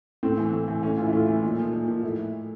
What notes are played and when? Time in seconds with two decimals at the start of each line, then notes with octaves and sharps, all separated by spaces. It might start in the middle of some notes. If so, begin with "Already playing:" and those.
0.23 A2 C4
0.38 E3
0.53 A2
0.68 E3
0.83 A2 C#4
0.98 E3 F4
1.06 E4
1.13 A2 F4
1.28 E3
1.43 A#2 D#4
1.59 F3
1.73 A#2
1.88 F3
2.03 A2 E4